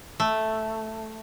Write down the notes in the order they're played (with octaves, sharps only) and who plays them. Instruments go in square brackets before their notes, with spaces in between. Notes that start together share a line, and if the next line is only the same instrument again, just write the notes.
[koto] A3